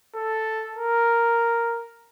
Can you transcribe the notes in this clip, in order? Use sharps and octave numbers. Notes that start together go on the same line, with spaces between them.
A4
A#4